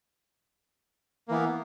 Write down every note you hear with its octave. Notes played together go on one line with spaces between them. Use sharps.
E3 A#3 B3